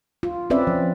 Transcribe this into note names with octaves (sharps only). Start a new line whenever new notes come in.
F4
C4 C#4 B4 D5 E5
F3